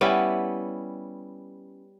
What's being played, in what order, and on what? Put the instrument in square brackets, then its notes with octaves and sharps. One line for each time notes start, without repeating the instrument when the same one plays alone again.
[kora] G3 B3 C#4 E4